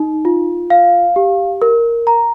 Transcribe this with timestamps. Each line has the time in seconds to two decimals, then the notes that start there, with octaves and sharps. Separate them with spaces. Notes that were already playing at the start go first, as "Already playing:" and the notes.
Already playing: D#4
0.25 F4
0.70 F5
1.16 G4
1.62 A#4
2.07 A#5